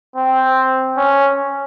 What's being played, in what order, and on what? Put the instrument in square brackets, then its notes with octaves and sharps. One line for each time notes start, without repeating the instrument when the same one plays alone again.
[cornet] C4
C#4